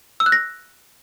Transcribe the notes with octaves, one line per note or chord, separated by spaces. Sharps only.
E6
F#6
A#6